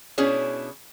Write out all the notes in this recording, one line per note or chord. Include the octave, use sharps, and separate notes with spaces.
B2 C#4 D4 E4 G#4 C#5